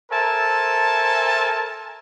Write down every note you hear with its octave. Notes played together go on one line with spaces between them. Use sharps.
A4 A#4 C5 E5 G#5 A5